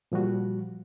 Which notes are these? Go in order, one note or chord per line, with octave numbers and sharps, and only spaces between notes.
A#2 F3 G3 F#4